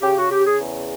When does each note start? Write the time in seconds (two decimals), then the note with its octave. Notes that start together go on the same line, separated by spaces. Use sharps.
0.02 C#3 G4
0.17 F#4
0.31 C#3 G4
0.45 G#4
0.60 E2